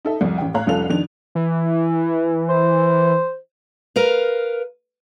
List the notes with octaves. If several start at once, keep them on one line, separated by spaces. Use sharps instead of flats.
D#4 A4 E5
C2 F2
A1 G5
A2 C#5 F5 A#5 F#6
F1 C2 C#4 F4 A4 F7
F2 D#3 D4 F7
E3
C5
A#4 B4 F5